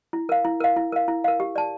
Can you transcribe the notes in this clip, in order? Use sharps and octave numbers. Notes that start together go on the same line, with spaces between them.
E4
A#4 F5
E4
A#4 F5
E4
A#4 F5
E4
A#4 F5
G4
D5 A5